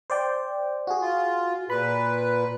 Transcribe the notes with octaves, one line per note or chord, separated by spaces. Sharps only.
C5 D5 G5
F#4 G#4
F4
A#2 B4 B5